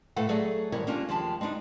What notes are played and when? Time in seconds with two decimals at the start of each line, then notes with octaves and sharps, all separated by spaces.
0.16 A2 A3 A4 B4 F5 F#5
0.29 F#3 A3 G#4 A4 D5
0.72 G#2 D3 D#3 G3 A#4 C#5
0.87 A#3 C#4 D4 F4 G4
1.09 D#2 F3 G#3 G4 A5
1.41 G#3 B3 D4 D#4